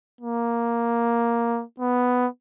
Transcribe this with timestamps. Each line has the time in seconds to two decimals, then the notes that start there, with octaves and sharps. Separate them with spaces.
0.21 A#3
1.80 B3